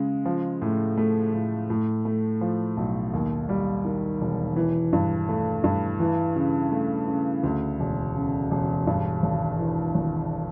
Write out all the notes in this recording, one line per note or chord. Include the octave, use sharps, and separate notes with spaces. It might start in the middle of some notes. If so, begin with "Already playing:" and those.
Already playing: C#3 G#3
F3
A2
A3
A2
A2
A3
F3
B1
D#2
G3
D#3
E1
E3
G2
A3
G2
E3
C#3
A3
C#3
D2
E1
C#3
E1
G2
G#1
E3
G#1